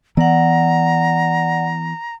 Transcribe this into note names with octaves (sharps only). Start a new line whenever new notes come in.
E3 B3 D5 F#5 A#5